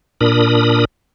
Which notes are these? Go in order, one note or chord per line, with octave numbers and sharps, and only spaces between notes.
A#2 D4 A#4 B5 D#6